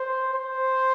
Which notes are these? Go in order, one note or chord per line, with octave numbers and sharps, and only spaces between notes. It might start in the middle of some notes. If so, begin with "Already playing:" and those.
Already playing: C5
C5